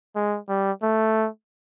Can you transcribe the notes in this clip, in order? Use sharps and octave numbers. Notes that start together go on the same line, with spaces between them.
G#3
G3
A3